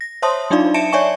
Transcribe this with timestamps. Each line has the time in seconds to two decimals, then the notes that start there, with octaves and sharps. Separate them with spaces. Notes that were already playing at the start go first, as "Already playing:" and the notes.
0.01 A#6
0.22 C5 C#5 E5 A5 C6 D#6
0.51 F#3 D4 D#4 F4 D5 F5
0.74 E5 A5 C#7 D7 E7
0.93 C#5 D5 E5 G#5 C#6